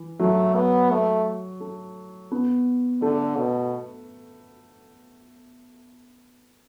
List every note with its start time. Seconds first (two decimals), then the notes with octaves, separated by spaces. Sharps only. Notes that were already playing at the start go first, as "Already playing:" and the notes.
Already playing: E3
0.19 F#3 A3
0.55 B3
0.91 A3
1.60 A3
2.32 B3
3.02 D3 A3
3.37 B2